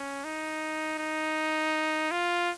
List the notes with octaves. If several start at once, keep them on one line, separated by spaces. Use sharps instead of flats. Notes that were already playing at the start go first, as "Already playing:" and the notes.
Already playing: C#4
D#4
D#4
F4